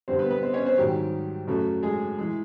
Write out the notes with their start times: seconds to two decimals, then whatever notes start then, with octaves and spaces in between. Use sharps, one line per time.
0.08 G2 D3 G3 C4 C5
0.19 B3 B4
0.31 B3 B4
0.43 C4 C5
0.54 C#4 C#5
0.66 C4 C5
0.78 G#2 D#3 F#3 G3 G4
1.47 F#2 C#3 F#3 A3
1.83 G#3 G#4
2.18 E3 G#3